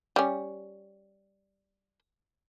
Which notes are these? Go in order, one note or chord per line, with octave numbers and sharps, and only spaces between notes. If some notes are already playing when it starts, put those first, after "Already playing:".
G3 C#4